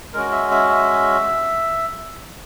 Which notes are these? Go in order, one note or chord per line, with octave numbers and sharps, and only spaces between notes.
G#3 C#4 F#4 A#4
E5
E5
E5